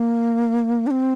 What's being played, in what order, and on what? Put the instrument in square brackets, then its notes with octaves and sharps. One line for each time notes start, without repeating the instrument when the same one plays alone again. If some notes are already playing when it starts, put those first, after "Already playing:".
Already playing: [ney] A#3
D4
C4